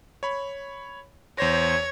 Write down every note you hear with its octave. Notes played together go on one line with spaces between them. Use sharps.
C#5 B5
E2 C5 C#5 A#6